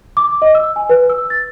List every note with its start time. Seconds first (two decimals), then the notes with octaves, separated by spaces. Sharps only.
0.17 D6
0.42 D#5
0.55 E6
0.76 G#5
0.89 B4
1.10 E6
1.30 A6